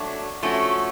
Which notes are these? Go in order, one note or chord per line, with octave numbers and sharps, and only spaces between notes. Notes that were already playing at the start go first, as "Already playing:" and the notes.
Already playing: F#3 A3 D4
F3 A3 C#4 F#4